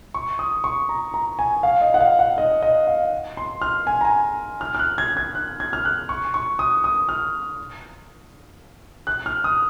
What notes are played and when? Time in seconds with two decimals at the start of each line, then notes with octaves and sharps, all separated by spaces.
0.14 C#6
0.39 D#6
0.64 C#6
0.89 A#5
1.14 A#5
1.39 G#5
1.63 F5
1.81 D#5
1.94 F#5
2.00 F5
2.19 F#5
2.38 D#5
2.62 D#5
2.87 F5
3.37 C6
3.62 F6
3.87 G#5
4.01 A#5
4.05 G#5
4.61 F6
4.75 F6
4.79 F#6
4.98 G#6
5.17 G#6
5.35 F#6
5.60 G#6
5.73 F6
5.85 F#6
6.09 C#6
6.34 C#6
6.59 D#6
6.84 D#6
7.09 F6
9.07 F#6
9.26 F6
9.44 D#6